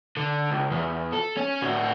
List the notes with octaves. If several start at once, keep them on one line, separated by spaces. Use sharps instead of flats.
D3
C#2
E2
A4
C#4
A2 F#4